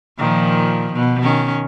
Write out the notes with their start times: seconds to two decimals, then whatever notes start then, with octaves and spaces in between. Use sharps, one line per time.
0.18 A#2 D#3 F3
0.94 B2
1.22 D#3 C#4